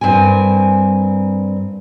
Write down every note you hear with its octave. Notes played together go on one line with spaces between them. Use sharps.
G2 C4 A#4 G#5